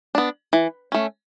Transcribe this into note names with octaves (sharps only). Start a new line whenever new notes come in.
B3 D4
E3
A3 C#4